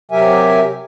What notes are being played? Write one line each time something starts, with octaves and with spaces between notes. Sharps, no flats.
C3 F#3 G4 A#4 E5 G#5